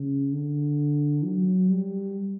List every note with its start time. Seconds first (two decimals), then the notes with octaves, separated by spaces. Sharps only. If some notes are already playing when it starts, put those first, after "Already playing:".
Already playing: C#3
0.32 D3
1.24 F#3
1.70 G3